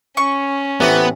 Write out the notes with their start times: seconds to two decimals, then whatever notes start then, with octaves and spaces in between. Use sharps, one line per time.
0.17 C#4 C#6
0.80 A1 E3 B3 C4